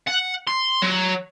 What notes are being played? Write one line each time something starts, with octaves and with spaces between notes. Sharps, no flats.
F#5
C6
F#3